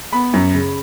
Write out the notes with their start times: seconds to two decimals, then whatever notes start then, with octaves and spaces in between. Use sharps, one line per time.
0.13 B3 B5
0.33 F#2
0.54 C#3